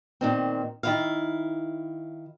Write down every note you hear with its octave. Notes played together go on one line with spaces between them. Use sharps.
A#2 D#3 C4
D#3 E4 F5